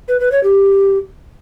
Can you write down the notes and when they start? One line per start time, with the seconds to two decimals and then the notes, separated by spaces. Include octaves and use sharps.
0.08 B4
0.20 B4
0.32 C#5
0.44 G4